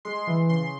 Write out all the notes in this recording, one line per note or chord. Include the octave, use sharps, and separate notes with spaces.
G#3 C6
E3
C#3 C6